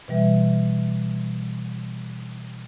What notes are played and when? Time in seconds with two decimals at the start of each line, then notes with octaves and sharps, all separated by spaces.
0.08 B2 E3 G3 B4 E5